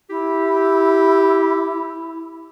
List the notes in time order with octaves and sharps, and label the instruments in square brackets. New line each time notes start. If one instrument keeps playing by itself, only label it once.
[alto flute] E4 [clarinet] G4